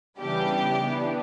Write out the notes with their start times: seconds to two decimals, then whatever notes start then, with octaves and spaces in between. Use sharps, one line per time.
0.19 C#3 E3 G3 B3 D4 G4
0.83 E3 B3 D4